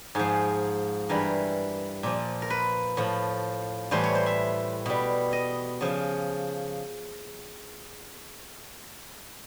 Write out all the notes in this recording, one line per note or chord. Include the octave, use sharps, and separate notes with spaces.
G#2 F3 G#4
G2 E3 G3 A#4
A#2 F3
A#4
B4
A2 F3
A2 E3 G3 C5
C#5
C5
E5
B2 G3
D#5
C#3 F3